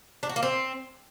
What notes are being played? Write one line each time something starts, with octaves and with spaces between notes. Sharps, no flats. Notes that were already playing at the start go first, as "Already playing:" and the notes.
D4
F#4
A#3
C4